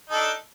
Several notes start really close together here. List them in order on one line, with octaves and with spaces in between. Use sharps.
D#4 A4 D4